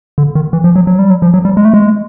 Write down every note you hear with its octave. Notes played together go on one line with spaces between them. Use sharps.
D3
D#3
E3
F3
F#3
F#3
G3
F#3
F3
F#3
G3
G#3
A3
G#3